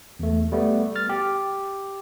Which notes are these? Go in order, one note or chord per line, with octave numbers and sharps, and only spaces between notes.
E2 A3
G3 A3 B3
F6 A6
G4